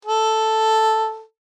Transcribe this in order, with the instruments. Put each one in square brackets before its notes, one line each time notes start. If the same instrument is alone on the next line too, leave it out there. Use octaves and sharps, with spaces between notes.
[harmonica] A4